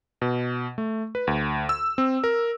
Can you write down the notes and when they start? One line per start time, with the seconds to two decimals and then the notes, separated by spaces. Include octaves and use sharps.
0.22 B2
0.78 A3
1.15 B4
1.27 D2
1.69 E6
1.98 C4
2.24 A#4